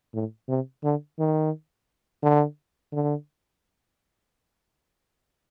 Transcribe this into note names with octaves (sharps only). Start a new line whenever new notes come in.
A2
C3
D3
D#3
D3
D3